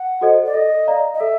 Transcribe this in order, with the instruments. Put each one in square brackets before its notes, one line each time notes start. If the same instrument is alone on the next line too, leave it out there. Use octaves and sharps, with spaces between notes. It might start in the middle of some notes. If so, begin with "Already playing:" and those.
Already playing: [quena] F#5
[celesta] F#4 A4 C5 D#5
[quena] D5
[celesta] A4 [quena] D#5
[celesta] D5 F5 A#5
[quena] D#5
[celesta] A4 [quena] E5